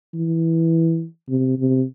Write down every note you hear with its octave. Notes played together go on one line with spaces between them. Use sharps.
E3
C3
C3